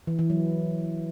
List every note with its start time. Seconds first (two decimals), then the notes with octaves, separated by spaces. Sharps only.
0.07 E3
0.19 E3
0.30 F#3